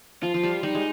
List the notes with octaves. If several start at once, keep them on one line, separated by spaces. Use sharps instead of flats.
F3 F4
F3
G3
G3 D#4
G#3